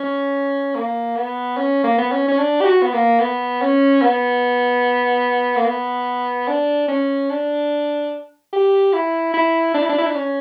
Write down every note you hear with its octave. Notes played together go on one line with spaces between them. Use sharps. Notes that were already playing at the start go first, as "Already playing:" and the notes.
Already playing: C#4
A#3
B3
C#4
A#3
B3
C#4
C#4
D4
G4
F#4
B3
A#3
B3
C#4
B3
A#3
B3
D4
C#4
D4
G4
E4
E4
D4
E4
D4
E4
D4
C#4